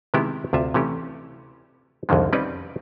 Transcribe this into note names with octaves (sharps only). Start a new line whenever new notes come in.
C3 D#3 G#3 B3 E4 G4
D2 C3 F4 E5
C3 E3 A3 C#4 G4
C2 F2 D3 D#3 G#3
G3 C4 C#4 D#4 B4 D5